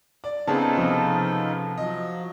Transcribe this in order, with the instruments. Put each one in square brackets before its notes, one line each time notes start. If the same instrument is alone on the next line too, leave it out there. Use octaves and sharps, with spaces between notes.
[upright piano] D5
[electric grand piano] C#3 B3 G#4 [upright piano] C4 A5 [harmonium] D#4 F4 A4
[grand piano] C3 F3
[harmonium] F3 F#3 [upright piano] D#5